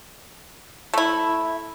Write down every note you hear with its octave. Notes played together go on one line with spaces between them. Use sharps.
A3 E4